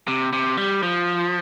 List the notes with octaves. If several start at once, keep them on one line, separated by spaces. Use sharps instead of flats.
C3
C3
G3
F3